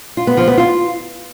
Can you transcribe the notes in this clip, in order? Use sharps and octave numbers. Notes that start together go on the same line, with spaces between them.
F4
B3
F3
B3
F4